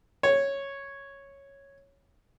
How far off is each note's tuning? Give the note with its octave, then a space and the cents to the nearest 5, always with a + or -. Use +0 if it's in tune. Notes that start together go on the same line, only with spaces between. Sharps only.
C#5 -5